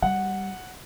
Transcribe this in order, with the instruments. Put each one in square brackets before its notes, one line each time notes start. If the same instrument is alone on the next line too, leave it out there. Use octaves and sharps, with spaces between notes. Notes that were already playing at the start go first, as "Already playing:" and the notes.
[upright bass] G3 [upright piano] F#5